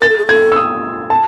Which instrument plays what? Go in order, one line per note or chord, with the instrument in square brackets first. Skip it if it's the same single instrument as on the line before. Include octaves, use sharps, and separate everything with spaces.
[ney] A#4 [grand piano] A6
[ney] A4
G#4
[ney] A4 [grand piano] G#6
[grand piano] E6
D#6
A5